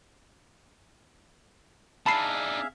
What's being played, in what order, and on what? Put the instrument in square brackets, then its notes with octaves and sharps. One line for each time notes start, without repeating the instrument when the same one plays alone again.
[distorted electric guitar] D4 D#4 [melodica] G#4 E5 F5 [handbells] A5 B5 C7